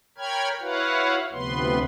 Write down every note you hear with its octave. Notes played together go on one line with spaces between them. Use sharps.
A#4 C#5 G5 B5 F6 G#6
E4 F#4 B4 C#5 F5 F#5
D2 C3 F3 B3 B4 C6